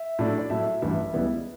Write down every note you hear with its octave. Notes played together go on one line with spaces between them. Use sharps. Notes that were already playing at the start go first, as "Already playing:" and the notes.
Already playing: E5
A2 F#3 A3 D4
D5
A2 F#3 A3 E5
E5
A1 G2 E3 E5
C#2 C#3 G3 B3 E4